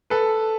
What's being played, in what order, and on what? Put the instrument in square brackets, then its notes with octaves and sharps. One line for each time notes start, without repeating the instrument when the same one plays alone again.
[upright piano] A4 B4